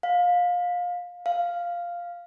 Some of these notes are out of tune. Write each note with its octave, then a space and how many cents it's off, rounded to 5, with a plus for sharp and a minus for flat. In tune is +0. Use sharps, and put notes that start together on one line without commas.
F5 +25
F5 -5